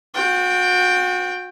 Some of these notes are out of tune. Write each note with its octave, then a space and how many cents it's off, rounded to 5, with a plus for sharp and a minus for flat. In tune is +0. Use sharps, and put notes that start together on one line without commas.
F#4 -35 G5 +0